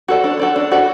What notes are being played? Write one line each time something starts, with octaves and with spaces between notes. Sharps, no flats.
F#4 A4 D5
D4
F#4 A4 D5
D4
F#4 A4 D5